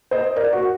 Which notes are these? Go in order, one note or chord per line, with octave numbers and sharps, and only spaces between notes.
C5 D#5
A#4 D5
F#4